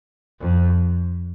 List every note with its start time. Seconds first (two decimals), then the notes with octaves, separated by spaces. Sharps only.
0.40 F2